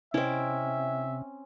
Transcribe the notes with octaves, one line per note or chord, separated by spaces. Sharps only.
C3 C4 C#4 E4 D#5 E5